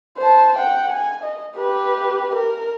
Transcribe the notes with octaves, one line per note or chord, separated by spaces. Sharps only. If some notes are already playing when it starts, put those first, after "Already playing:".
C5 A5
F#5 G5
G#5
D#5
G4 B4
A#4